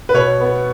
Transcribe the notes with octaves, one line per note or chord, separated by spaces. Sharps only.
B4
B2 C#5
B3